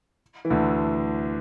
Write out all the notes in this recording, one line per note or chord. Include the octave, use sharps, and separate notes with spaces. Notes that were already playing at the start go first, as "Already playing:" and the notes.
E3
D2 D3